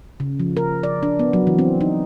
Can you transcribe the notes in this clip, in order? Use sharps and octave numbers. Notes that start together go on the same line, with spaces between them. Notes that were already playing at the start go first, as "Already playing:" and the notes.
C#3
F3
A#4
D5
D4
B3
F#3
E3
C4
D#4